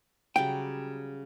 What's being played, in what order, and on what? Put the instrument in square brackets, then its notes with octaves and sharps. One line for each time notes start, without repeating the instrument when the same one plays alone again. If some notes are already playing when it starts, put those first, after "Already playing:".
[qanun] C#3 F#3 G3 [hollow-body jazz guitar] G5